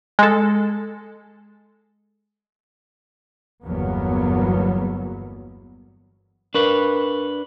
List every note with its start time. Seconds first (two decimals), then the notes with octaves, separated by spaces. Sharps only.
0.19 G#3 A4
3.62 G1 E2 F#3 A#3 B3
6.54 D4 A#4 B4 C#6